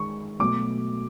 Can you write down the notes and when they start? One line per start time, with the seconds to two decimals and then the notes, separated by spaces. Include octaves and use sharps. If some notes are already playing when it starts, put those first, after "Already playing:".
Already playing: D#3 G#3 C#6
0.39 B2 F#3 A3 D6